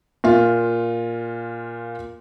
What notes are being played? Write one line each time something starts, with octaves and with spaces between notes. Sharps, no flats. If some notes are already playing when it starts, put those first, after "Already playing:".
A#2 F4